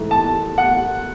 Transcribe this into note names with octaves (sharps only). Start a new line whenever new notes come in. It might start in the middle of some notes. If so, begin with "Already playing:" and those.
Already playing: G#2 E3 A3
A5
F#5